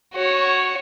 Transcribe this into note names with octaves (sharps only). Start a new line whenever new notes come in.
F#4 C#5